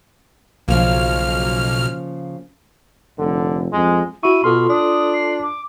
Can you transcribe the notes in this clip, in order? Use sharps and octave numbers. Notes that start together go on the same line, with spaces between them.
B1 C#3 F3 A#3 F6
F1 D3
F2 G#3
E4 F#4 C#6 D#7
B2 F4 A4 C6 F6
D4 D#6
C7
D6